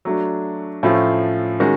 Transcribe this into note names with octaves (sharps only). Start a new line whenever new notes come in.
F#3 A3 D4
A2 F3 A3 C#4 F4
D#3 G#3 C#4 F#4